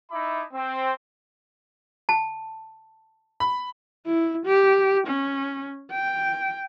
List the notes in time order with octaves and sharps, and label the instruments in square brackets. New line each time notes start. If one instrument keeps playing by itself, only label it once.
[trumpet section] D#4 E4 E5 A5 B5 D6
C4
[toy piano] A5
[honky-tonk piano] B5
[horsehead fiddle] E4
G4
C#4
G5